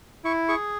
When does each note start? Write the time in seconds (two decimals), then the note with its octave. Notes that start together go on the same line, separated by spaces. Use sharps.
0.24 E4 C#6
0.48 G#4 C#6